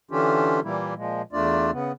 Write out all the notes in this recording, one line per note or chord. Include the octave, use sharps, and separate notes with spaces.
D3 E3 C#4 D4 F4 G4
A#2 E3 G3 A#3 E4
A#2 F3 G#3
E2 A3 D4 F4 D5
C#3 B3